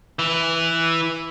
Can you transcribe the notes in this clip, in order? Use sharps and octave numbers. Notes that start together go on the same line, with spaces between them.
E3